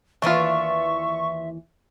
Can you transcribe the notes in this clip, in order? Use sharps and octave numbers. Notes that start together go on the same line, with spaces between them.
D#2 E3 D4 F4 B4 E5 C#6